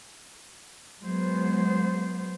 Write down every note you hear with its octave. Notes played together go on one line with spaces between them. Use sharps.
F#3 G#3 B3 C5